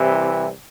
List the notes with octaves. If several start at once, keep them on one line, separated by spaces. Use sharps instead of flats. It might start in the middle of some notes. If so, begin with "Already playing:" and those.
Already playing: C2 C3 E3